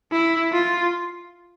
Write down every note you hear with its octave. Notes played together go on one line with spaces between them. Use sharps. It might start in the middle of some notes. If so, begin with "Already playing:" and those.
E4
F4